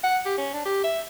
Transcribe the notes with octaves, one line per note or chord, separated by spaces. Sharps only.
F#5
G4
C#4
D4
G4
E5